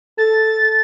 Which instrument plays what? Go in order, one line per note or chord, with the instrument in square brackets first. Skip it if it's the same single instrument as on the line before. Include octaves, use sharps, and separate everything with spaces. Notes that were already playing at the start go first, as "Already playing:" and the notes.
[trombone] A4 [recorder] A6